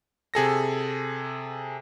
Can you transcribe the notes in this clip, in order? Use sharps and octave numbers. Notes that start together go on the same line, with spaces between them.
C3 G#4 A4 A#6